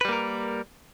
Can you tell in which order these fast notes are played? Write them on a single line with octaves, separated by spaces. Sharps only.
B4 G3 A#3 A#4